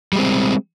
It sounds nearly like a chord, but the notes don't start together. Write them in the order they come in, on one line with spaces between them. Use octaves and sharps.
G3 G#3 C4